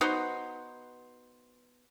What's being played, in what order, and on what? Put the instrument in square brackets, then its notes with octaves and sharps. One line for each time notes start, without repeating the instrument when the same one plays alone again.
[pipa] B3 D#4 F#4 C5